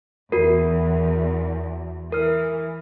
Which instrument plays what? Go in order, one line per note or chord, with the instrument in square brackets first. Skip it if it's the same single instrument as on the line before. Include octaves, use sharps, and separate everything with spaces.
[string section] E2 [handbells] F#4 A#4
[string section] E3 [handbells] A#4 F6